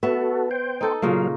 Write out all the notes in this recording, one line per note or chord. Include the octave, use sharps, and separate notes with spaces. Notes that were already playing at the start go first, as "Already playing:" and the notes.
B3 F#4 A4 E5
C5 G5
D#4 A4
A#2 C#3 F#3 A#3 F5